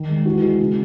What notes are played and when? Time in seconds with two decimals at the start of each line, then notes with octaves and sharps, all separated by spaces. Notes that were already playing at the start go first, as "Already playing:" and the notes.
Already playing: D#3
0.09 G#3
0.25 E3 F#4
0.42 G#3
0.60 C#3